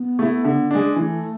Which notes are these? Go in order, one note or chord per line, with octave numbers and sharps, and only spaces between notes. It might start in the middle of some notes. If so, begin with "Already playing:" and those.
Already playing: B3
A3 E4
D3
G#3 D4
E3 A3